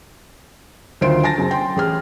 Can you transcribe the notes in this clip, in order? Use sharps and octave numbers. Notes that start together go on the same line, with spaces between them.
D2 D#3 F4 C5 C6 D7
G#5 A5 A6 A#6
F#2 C#3
G5 C6
A1 G#4 F6